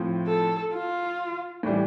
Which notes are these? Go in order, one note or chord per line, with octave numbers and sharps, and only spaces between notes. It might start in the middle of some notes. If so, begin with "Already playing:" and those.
Already playing: A2 F3 C4
A4
F4
A2 E3 G3 D4 G4